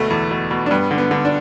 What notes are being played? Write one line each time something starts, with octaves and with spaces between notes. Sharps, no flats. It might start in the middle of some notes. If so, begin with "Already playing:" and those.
Already playing: D2 B2 A3
E2
B2
B2
D4
G2 B3
D3
B3
D3
D4